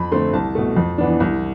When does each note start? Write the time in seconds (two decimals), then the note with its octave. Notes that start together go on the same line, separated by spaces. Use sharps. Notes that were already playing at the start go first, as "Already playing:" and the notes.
Already playing: F2 B5
0.12 D3 A3 C4 C6
0.33 C2 A5
0.55 B2 A3
0.76 F2
0.98 E3 B3 D4
1.20 C2